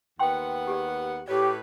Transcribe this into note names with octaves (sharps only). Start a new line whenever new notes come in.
D#2 B3 F#5 G5 C6
G4 G#4 D5
A2 G4 B4 C#5 D5